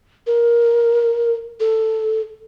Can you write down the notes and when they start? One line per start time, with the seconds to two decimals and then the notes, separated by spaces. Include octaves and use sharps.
0.27 A#4
1.60 A4